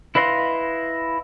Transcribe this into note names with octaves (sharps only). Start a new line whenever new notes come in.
E4 B4 D#5 F5 C6